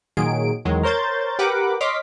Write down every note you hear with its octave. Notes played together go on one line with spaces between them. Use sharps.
A#2 D#3 F#3 G#4 D7
E2 D#3 F#3 G#3
A#4 C5 C#5 G6 A6
G4 A#4 B4 F#5 D6
C#5 D#5 C6 D6 F6 B6